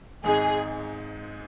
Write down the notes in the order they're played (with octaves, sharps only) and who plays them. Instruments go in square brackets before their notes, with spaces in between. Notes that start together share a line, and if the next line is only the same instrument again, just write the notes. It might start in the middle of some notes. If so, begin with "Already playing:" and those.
[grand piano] G#1 G#2 G#3 D#4 [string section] G#4